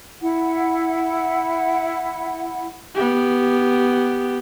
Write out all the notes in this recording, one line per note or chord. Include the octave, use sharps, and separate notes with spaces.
E4 F#5
B3 G4